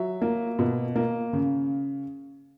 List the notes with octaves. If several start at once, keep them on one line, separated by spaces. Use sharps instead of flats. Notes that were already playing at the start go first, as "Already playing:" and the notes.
Already playing: F#3 E5
A#3
B2
A#3
C#3